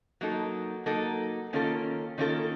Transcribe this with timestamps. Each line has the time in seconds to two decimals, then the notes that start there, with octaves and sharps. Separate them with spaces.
0.21 F#3 A#3 D#4 A4
0.86 F#3 A#3 D#4 A4
1.53 D#3 A#3 C#4 F4 A4
2.18 D#3 A#3 C#4 F4 A4